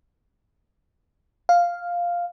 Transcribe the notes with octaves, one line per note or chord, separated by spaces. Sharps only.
F5